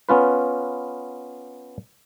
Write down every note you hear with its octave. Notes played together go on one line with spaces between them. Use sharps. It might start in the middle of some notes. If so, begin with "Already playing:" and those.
B3 C#4 F4 B4